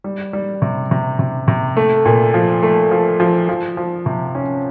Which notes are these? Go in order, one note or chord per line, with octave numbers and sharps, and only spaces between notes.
G3
G3
C3
C3
C3
C3
A3
A#2
F3
A3
F3
F3
F3
F3
C3
C#4